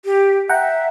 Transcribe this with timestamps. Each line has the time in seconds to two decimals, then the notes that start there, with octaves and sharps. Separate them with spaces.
0.05 G4
0.49 E5 F#5 G5 A#5